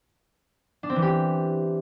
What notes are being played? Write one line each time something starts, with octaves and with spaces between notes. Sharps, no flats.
D4
C4
E3
G4